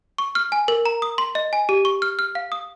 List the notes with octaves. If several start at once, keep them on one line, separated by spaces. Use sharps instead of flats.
C#6
F6
G#5
A#4
A#5
D#6
C6
D#5
G#5
G4
C#6
F6
F6
F5
D#6